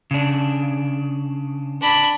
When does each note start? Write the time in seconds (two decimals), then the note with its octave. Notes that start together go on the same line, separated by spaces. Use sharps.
0.11 C#3 D4
1.81 D4 B5